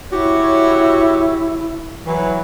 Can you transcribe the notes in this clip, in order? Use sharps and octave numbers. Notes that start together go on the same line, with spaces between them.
E4 F#4 G4 C#5
E3 F#3 B5